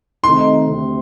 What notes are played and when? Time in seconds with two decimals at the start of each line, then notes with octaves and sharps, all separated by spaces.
0.24 C3 D#3 A3 C4 D#4 C6
0.69 D2 C3